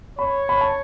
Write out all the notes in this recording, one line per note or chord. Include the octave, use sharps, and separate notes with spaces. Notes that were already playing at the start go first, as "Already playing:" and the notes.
C#5 B5
B5
A5